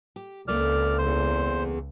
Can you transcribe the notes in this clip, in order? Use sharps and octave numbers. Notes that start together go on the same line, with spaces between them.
G4
C#2 A3 A#3 C4 D5 F6
E2 C5